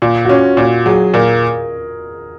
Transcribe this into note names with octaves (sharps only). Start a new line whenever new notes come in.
A#2 F4
F#4
C#4 F4
A#2 F#4
F#3 G#4
A#2 A#4